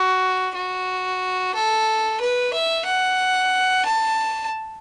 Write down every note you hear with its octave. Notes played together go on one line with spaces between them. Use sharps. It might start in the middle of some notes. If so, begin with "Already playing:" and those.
Already playing: F#4
F#4
A4
B4
E5
F#5
A5